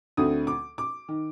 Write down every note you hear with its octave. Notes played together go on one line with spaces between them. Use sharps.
D2 D3 A3 C4 D#6
D6
D6
D#3